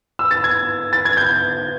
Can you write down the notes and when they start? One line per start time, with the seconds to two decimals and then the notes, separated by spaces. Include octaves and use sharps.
0.19 E6
0.31 A6
0.44 G#6
0.93 A6
1.05 G#6
1.17 G6